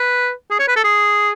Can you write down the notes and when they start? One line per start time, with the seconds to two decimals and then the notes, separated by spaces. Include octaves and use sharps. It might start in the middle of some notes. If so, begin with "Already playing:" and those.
Already playing: B4
0.51 G#4
0.59 C#5
0.68 B4
0.76 A4
0.84 G#4